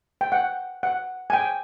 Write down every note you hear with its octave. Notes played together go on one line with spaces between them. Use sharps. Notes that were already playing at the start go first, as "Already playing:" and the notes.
G5
F#5
F#5
G#5
G5